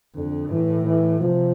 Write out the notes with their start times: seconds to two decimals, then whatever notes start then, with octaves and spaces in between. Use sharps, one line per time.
0.15 F2 D3
0.51 A2 E3
0.85 E3
1.20 C3 F3